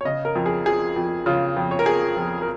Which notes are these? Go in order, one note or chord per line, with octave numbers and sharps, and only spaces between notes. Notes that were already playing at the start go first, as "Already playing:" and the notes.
C#5
C#3 D#5
A#4
F2
G#4
F3 G#4
F2
C#3 F4
F2
C#5
A#4
F3 G#4
F2
A#4